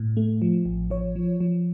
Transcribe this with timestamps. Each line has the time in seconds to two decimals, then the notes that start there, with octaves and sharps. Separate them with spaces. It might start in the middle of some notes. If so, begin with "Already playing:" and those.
Already playing: A2
0.17 A3
0.42 F3
0.66 A1
0.90 F3 C#5
1.16 F3
1.40 F3